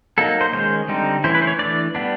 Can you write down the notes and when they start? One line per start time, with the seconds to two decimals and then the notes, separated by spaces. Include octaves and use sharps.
0.18 F#3 A#3 D#4 A4
0.41 C5
0.53 D#3 G#3 C#4 C5
0.88 D3 G3 C4 D#4
1.24 E3 A3 C#4 E4 C5
1.35 B4
1.42 C5
1.47 C#5
1.59 E3 A3 D4 D5
1.95 G3 B3 D4